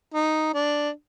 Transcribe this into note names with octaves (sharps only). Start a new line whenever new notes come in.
D#4
D4